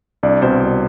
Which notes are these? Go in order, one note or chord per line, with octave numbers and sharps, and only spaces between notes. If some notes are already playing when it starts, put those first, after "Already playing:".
C2 D4 D5
B2 C4 C5
C2